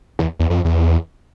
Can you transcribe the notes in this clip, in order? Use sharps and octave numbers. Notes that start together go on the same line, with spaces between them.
E2
E2
F2
E2